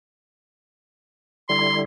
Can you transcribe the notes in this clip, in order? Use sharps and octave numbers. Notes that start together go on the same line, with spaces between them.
D3 G3 E4 C6